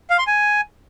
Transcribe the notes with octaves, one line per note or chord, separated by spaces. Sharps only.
F5
C6
G#5